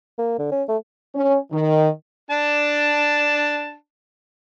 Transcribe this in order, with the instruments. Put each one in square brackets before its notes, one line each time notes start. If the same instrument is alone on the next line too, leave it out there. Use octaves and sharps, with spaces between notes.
[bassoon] A#3
D3
C#4
A3
[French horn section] C#4
D#3
[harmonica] D4 A5